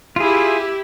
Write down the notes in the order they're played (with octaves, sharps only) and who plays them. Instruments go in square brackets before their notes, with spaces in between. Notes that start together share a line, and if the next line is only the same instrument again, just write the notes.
[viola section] E4 G4 [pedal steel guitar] F4 G#4